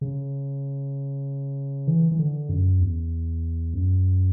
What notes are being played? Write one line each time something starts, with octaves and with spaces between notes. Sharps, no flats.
C#3
E3
E3
D3
F#2
E2
F#2